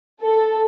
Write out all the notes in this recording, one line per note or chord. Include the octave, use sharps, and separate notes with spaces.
A4